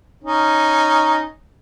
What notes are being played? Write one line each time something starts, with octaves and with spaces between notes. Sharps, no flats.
C#4 D#4